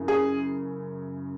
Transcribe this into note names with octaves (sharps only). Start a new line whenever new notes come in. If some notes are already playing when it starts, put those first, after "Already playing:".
Already playing: F#2 C#3 E4
G#4